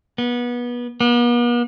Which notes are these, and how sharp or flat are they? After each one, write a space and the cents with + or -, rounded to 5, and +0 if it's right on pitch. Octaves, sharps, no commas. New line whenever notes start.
B3 -25
B3 -45